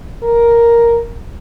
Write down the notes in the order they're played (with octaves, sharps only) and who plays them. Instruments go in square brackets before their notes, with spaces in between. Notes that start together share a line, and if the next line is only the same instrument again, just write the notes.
[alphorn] A#4